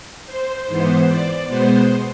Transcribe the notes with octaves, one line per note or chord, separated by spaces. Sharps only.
C5
G#2 E3 B3 C5
D5
B2 G#3 B3 C5